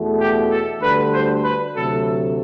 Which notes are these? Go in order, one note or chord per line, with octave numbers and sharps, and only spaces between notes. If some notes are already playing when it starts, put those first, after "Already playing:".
Already playing: E2 B2 A3
G4
A4
D2 D3 G3 B4
C5
B4
D2 C3 F#3 A3 A4